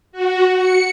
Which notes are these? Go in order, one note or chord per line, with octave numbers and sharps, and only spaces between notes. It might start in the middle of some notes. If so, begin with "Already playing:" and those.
F#4
C#7